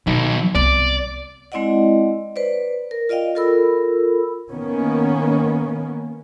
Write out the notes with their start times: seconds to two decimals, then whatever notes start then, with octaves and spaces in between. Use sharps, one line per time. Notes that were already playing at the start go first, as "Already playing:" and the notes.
0.07 B2 D#3 F#3 D#4
0.55 C2 B3 D5
1.52 G#3 C4 E4 D5 D#5 F#5
2.36 B4 C5 D5
2.91 A#4
3.09 F4 D5 D#5 F5 G5
3.35 F4 A4 A#4 B5 E6
4.51 D#3 A#3 B3 C#4